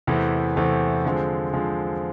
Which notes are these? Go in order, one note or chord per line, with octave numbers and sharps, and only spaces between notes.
E2 C3 E3 A3
E2 C3 E3 A3
D3 F3 G#3 C4
D3 F3 G#3 C4